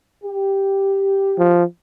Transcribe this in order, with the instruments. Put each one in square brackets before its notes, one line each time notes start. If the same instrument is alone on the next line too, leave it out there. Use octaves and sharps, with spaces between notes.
[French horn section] G4
[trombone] F3